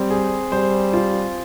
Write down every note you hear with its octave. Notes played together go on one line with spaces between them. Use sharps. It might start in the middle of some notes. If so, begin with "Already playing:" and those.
Already playing: G3 C4
G#4
G3 C5
F4